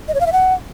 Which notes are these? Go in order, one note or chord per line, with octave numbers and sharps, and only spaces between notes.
D#5
C#5
F5
E5
F#5